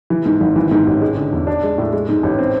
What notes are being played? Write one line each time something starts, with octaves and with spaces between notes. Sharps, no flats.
E3
G#2
G#1
E3
G#2
A1
G#3
D3
E2
D4
G#3
A2
G#3
G#2
A1
C4